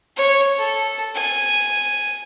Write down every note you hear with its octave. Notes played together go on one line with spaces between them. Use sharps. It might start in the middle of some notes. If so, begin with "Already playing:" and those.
C#5
A4
G#5